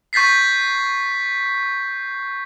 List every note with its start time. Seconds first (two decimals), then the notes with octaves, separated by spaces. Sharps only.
0.13 C#6 G6 A6 B6 C7